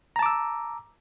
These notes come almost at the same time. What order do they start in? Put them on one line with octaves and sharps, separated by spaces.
A#5 A5 D6 E6